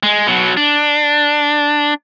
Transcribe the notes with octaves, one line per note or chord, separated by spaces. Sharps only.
G#3
B2 F#3
D4